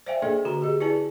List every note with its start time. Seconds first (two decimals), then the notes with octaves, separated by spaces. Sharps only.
0.06 C5 D5 E5 F5 G5 G#5
0.22 A#3 D4 G#4 A4 D5 D#5
0.45 D3 F#4 A#5
0.62 G4 G#4 D#5
0.81 E4 G#4 B4 D5 G#5 A5